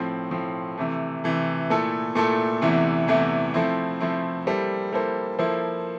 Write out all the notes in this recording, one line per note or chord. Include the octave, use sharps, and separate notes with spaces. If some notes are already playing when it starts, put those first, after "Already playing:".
Already playing: A2 F3 C4
A2 F3 C4
C3 E3 A3
C3 E3 A3
A#2 A3 E4 A4
A#2 A3 E4 A4
E2 C3 E3 A3 E4
E2 C3 E3 A3 E4
F3 A3 C4 E4
F3 A3 C4 E4
G3 A#3 E4 A4 C5
G3 A#3 E4 A4 C5
F3 A#3 E4 A4 C5